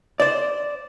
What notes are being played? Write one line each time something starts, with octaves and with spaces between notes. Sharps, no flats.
C5 D5